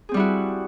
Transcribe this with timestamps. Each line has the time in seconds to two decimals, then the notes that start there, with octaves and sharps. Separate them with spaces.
0.09 G#4
0.12 C4
0.14 G3
0.17 E4
0.19 F#4